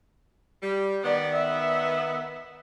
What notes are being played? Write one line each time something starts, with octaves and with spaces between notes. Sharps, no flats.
G3
D#3 B3 D5
E5